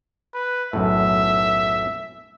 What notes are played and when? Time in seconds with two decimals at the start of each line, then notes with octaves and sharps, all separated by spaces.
0.34 B4
0.73 B1 F#2 A2 E5